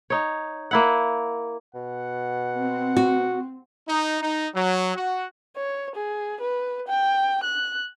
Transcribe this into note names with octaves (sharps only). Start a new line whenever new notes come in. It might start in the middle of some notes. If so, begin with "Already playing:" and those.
D#4 C#5
A#3 E4 F#5
B2 F#5
C4
F#4
D#4
D#4
F#3
F#4
C#5
G#4
B4
G5
F#6